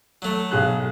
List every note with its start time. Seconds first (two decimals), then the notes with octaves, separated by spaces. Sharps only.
0.22 F#3 A3
0.51 B1 G#4 F#6